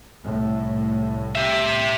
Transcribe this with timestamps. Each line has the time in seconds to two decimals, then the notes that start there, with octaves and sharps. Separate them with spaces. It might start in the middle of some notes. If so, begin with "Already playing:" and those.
0.24 C2 A2
1.35 G4 E5